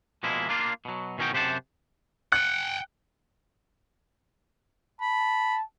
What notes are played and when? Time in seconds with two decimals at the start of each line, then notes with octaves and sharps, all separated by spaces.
0.23 B2 F3 G#3 A#3 E4
0.49 A#3 D4 F4
0.85 B2 F#3
1.18 B2 D#3 C#4 D#4 F#4 G5
1.33 F#2 C3 G4 C5 F#5 A5
2.32 F#5 G5 F#6
5.01 A5 B5